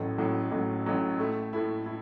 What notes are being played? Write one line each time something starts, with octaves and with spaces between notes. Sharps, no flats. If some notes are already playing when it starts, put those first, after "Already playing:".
Already playing: A1 A2 F#3 A3
A1 A2 F#3 A3
A1 A2 F#3 A3
A1 A2 F#3 A3
A2 A3 E4
A2 A3 E4
E4